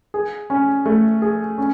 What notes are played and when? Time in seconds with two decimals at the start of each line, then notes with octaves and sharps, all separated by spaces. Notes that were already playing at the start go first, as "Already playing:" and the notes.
0.14 G#4
0.50 C#4
0.86 A3
1.22 G#4
1.58 C#4